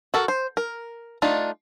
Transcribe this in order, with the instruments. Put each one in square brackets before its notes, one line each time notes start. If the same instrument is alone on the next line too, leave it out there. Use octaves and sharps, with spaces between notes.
[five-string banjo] F#4 A4 A#4
C5
A#4
A3 D4 D#4 F4